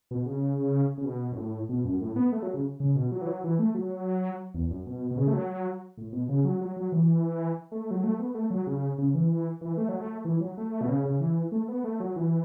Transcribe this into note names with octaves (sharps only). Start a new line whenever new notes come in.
B2
C#3
C#3
B2
F#2
A2
B2
F#2
A2
B3
A3
F#3
C#3
C#3
B2
F#3
E3
F#3
E3
A3
F#3
E2
F#2
B2
B2
C#3
A3
F#3
A2
B2
C#3
F#3
F#3
F#3
E3
A3
F#3
A3
B3
A3
F#3
C#3
C#3
E3
E3
A3
F#3
A3
E3
F#3
A3
B2
C#3
C#3
E3
A3
B3
A3
F#3
E3